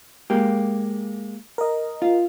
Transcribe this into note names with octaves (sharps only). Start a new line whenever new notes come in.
G#3 A#3 G4
A#4 D#5
F4